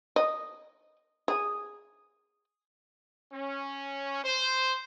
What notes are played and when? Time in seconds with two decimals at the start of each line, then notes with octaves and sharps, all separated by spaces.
0.16 D#5
1.28 G#4
3.32 C#4
4.24 C5